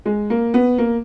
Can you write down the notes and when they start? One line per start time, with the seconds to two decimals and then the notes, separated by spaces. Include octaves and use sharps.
0.06 G#3
0.30 A#3
0.54 B3
0.78 A#3